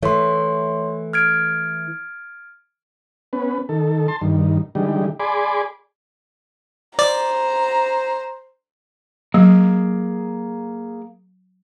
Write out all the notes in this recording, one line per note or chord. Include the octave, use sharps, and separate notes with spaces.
E3 A3 C#5 C6
F6 G#6 D7
B3 C#4 B4
D#3 A4
A5 C6
G2 D#3
D3 E3 G3 G#3 D#4 G4
G#4 D5 G#5 B5 C6 D6
C5 D5 A#5
F#3 A#3 G#4